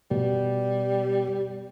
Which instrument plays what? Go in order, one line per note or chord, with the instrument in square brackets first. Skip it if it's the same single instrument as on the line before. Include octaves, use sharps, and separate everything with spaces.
[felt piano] B2 [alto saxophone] G3